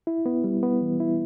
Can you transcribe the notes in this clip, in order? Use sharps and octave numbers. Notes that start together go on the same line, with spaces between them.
E4
B3
G3
B3
E3
E4